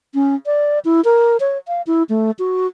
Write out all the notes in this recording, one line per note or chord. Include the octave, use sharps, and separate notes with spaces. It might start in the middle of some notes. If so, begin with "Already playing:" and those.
C#4
D5
E4
A#4
C#5
F5
E4
A3
F#4